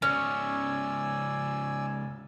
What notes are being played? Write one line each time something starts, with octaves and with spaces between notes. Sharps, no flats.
G#2 C#3 C#4 D5 G#5 E6